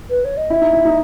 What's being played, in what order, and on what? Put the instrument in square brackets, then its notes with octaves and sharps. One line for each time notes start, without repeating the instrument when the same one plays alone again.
[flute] B4
C#5
D#5
[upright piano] E4 [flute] E5
[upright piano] D#4
E4
D#4